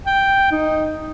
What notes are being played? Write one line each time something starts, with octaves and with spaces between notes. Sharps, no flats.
G5
D#4